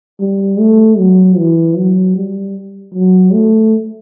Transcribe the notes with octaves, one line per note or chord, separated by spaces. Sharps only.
G3
A3
F#3
E3
F#3
G3
F#3
A3